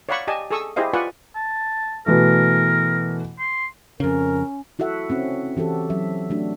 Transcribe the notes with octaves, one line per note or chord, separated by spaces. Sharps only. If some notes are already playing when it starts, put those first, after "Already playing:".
C#5 D5 F5 F#5 B5 C#6
G4 D5 D#5 G#5 A5
G#4 A4 G#5 C#6 D#6 E6
E4 G4 G#4 C5 D#5 F5
F4 B4 D5 F#5 G#5 C#6
A5
B2 E3 A3 A#4
C6
F2 C#3 C#4 A#4
E4 F#4 A4 E5 F#5
C4 C#4 F#4
E3 F#4 G4 A4
F#3 E5
A3 D4 F#4